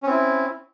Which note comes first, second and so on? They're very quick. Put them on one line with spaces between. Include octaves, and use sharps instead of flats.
C#4 C4 E4